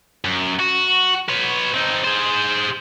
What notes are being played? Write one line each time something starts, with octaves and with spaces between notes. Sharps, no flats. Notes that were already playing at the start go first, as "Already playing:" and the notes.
F#2
F#4
B4 C#5
C4 D#4
G#4 C5